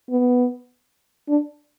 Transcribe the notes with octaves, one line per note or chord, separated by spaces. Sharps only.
B3
D4